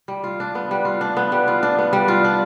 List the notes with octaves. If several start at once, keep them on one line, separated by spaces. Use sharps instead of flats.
G3
F4
D4
B3
G3
F4
D4
B3
G3
F4
D4
B3
G3
F4
D4